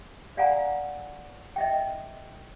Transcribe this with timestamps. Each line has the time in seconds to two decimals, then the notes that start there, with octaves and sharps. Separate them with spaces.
0.37 D5 F5 F#5 G#5 A#5 B5
1.56 D#5 E5 G5